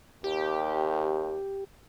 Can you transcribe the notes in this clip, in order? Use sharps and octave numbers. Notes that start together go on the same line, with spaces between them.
D#2 G4